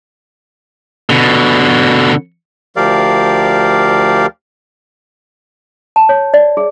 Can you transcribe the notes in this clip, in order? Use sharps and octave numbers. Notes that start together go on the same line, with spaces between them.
B2 D3
D2 F3 G4 A#4 D5 F5
A5
C#5
D5
G#4